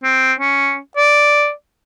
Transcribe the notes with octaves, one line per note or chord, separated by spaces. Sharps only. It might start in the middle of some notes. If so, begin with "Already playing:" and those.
C4
C#4
D5